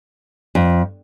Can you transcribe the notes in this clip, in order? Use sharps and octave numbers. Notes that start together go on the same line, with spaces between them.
F2